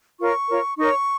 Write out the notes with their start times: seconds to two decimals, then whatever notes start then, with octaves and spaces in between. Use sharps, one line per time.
0.19 F4 A#4 C#5 C#6
0.49 F4 A#4 C#5
0.78 D#4 A#4 C#5 C#6